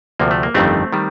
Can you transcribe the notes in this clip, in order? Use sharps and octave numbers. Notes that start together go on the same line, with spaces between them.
D2 C3 F3 A#3
A3
A#3
G1 F2 D#3 G3 A3 C4
D#3 G3